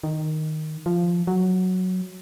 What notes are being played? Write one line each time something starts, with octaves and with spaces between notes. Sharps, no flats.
D#3
F3
F#3